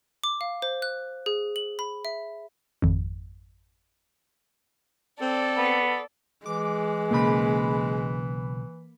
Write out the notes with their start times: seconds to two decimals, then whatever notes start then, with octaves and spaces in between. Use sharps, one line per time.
0.24 D6
0.41 F5
0.62 C5
0.82 F#6
1.26 G#4
1.56 F#7
1.79 B5
2.05 E5
2.82 G#1 F2
5.21 C4 A4 D5
5.57 B3
6.46 E3 G#3 D6
7.11 B1 C#3 A#3 B5